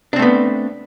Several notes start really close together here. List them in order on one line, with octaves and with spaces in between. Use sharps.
D4 C4 A3 B3